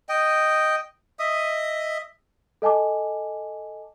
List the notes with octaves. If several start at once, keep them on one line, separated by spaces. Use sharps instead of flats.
D#5 G5
D#5 E5 D#6
A4 D#5 G#5 A5 D6